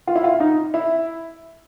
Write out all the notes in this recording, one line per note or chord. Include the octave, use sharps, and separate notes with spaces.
F4
E4
F4
D#4
E4